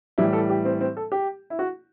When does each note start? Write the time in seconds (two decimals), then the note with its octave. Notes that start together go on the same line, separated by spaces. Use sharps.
0.18 A2 E3 G3 E4
0.33 A4
0.49 G4
0.65 C4
0.81 C4
0.97 A4
1.12 G4
1.50 E4
1.59 F#4